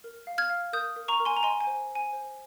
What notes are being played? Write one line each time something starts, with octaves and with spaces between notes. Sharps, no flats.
A#4
F5
F6 G#6
F5
A#4 D#6 G6
A#4
A#5 C#6
A#4
G#5 C6
A#5
D#5 G#5 C6
G#5
C5
C5 G#5
C5